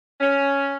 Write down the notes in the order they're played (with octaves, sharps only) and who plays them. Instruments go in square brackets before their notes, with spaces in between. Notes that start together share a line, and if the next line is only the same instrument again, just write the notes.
[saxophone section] C#4